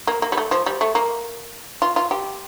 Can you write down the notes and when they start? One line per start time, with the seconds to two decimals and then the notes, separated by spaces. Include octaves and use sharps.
0.07 A#3
0.22 A#3
0.32 G3
0.37 A3
0.51 F3
0.66 G3
0.81 A3
0.95 A#3
1.82 F4
1.96 F4
2.11 G4